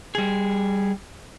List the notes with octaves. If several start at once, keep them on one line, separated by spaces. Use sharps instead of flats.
G3 G#4